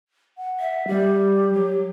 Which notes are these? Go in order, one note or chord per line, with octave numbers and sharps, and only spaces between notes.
F#5
E5
G3 G4
F#3